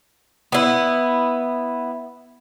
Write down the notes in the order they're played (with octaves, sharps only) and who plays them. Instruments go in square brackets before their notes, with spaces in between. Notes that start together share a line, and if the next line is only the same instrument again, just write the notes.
[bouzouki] B3 E4